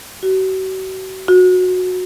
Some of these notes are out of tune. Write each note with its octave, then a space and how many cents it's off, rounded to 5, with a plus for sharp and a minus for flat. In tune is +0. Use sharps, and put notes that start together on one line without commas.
F#4 +40
F#4 -15